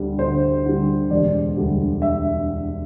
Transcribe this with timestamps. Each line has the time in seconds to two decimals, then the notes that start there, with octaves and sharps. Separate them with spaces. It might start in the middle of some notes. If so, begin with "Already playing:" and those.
Already playing: D2 D3 G3
0.19 D2 C5
0.65 D3 G3
1.10 E1 D5
1.57 D2 D3 G3
2.02 E5